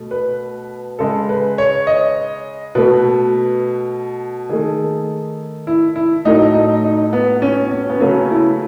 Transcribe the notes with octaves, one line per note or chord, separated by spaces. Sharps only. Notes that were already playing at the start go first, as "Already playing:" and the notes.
Already playing: B2 A3
B4
C#3 G#3 A4
B4
C#5
D#5
B2 A3 B4
D#3 A3 G#4
E4
E4
A2 F#3 A3 D#4
D#4
D#4
B3
C#4
C#4
B3
C#3 F#3 A3 C#4
E4